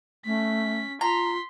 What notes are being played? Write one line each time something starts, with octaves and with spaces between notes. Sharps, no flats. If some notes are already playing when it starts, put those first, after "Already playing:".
A3 C#4 B6
F4 A#5 C6 B6